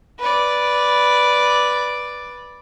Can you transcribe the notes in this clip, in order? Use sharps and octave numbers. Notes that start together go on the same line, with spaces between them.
B4 D5